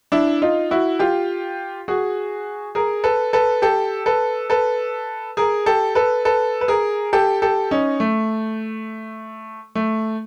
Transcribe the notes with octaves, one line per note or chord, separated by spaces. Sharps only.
D4 E4
D#4 F4
E4 F#4
F4 G4
F#4 G#4
G#4 A#4
A4 B4
A4 B4
G4 A4
A4 B4
A4 B4
G#4 A#4
G4 A4
A4 B4
A4 B4
B4
G#4 A#4
G4 A4
G4 A4
C#4 D#4
A3
A3